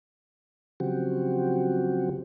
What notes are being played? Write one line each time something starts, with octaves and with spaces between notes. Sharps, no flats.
C#3 F3 F#3 C4 F#4 G4